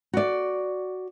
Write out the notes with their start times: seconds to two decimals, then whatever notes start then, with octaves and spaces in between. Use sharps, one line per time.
0.13 F#4 D5